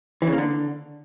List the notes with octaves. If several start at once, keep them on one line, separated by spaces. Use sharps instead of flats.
E3
C#3
A#3
D3